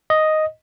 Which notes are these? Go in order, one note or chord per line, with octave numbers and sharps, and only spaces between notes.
D#5